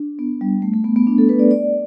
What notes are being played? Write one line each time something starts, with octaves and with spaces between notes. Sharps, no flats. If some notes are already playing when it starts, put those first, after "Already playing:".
Already playing: D4
B3
G3
A3
A3
B3
B3
D4
A4
B4
D5
D5